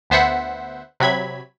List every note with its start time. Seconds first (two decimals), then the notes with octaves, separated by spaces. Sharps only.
0.10 D2 B3 C5 E5 F#5
1.00 C3 F#3 B5 G#6